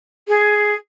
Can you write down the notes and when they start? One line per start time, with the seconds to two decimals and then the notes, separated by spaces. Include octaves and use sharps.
0.28 G#4